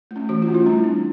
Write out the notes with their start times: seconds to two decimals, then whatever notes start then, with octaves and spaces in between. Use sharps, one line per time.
0.11 A3
0.16 C#4
0.29 E3 F#4
0.42 F4
0.48 A3 C#4
0.54 E4
0.66 G3 D4
0.84 C4